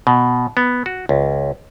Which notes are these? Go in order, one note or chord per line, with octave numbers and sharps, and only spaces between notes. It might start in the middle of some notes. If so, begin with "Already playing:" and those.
B2
B3
F#4
C#2